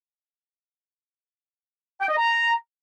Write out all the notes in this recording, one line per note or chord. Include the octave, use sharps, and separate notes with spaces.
G5
D#5
A#5